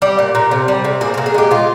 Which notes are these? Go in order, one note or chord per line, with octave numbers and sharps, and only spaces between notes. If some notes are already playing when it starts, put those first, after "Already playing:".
G3 G4
A#2
A#2
C3
G3
C3
A#2 G#4
A#2 A#4
G#4
G#3 G4
G#3 F4